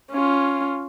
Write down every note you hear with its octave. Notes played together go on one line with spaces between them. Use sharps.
C#4 F4